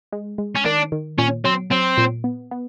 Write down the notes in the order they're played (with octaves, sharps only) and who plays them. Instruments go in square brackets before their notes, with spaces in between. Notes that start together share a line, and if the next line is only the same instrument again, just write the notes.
[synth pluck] G#3
G#3
[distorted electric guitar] C#4
[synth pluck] D#3 [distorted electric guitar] D4
[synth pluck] D#3
[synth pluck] A#2 [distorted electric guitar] C#4
[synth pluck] F#3 [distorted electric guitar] C4
[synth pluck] F#3 [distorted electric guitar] C4
[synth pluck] A#2
B3
B3